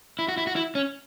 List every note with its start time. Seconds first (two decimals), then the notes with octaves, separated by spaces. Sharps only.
0.19 E4
0.28 F#4
0.38 E4
0.47 F#4
0.56 E4
0.75 C#4